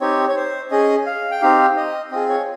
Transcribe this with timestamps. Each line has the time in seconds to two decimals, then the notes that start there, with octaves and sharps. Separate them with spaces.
0.01 C4 D#4 G4 C#5
0.29 C#5
0.36 C5
0.71 C#4 G#4 D#5
1.06 F5
1.31 G5
1.42 C4 D#4 G4 F5
1.77 D#5
2.11 C4 F4 G#4 D#5
2.29 C#5